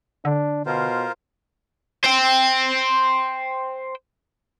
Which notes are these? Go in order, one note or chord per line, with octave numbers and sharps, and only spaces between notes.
D3 D4
B2 F4 A#4 C5
C5 G5